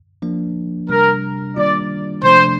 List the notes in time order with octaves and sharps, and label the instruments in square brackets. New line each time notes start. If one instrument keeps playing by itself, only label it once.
[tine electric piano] F3 A#3 D4
[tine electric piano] C3 G3 D4 [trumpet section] A#4
[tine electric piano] D#3 G3 A#3 D4 F4 [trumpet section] D5
[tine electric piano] C3 F3 A3 D4 [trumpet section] C5